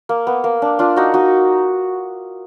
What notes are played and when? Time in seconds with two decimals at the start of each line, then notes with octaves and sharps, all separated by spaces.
0.09 A#3
0.27 B3
0.44 A#3
0.62 D4
0.79 D4 F4
0.96 D#4 F#4
1.14 D#4 F#4